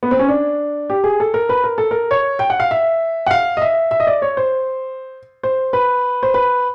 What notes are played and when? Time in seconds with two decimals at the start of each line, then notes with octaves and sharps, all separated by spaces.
0.03 B3
0.11 C4
0.19 C#4
0.29 D4
0.90 G4
1.04 G#4
1.20 A4
1.34 A#4
1.49 B4
1.64 A#4
1.78 A4
1.91 A#4
2.11 C#5
2.39 G5
2.50 F#5
2.60 F5
2.71 E5
3.26 F#5
3.31 F5
3.57 D#5
3.61 E5
3.91 E5
4.00 D#5
4.07 D5
4.22 C#5
4.37 C5
5.43 C5
5.73 B4
6.23 C5
6.34 B4